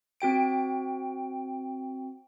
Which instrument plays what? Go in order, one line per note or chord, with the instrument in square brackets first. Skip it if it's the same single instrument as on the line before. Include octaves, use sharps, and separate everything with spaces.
[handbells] C4 F#4 G5 D7